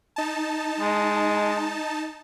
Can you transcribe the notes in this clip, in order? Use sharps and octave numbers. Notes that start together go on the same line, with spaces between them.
D#4 A5
G#3